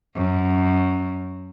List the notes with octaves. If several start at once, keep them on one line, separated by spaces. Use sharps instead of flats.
F#2